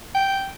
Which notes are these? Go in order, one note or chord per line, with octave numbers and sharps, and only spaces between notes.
G5